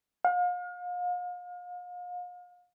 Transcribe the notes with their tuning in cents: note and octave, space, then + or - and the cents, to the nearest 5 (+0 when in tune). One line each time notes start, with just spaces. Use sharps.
F5 +40